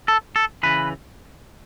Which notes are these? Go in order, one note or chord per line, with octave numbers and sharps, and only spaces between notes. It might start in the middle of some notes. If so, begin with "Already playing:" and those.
A4
A4
C#3 E3 B4